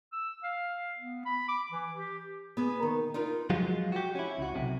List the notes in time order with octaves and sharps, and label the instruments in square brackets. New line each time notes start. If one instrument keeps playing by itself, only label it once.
[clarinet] E6
F5
B3
B5
D6
E3
G4
[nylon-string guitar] B3 G#4 B4
D#3
D#4 F4 A#4 B4
[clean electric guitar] F3 F#3 G#3 F4
F#4 G4
C#4 E4
C#2 F#4
B1 C3